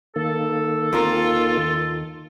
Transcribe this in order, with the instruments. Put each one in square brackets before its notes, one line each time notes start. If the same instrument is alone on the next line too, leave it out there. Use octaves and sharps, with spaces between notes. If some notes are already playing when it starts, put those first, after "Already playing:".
[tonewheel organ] D#3 A#3 [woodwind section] A4
[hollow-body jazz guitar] D#2 C4 A#4 [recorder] F4